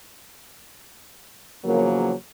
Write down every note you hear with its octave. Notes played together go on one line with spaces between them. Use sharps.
E2 C#3 F3 F#3 A#3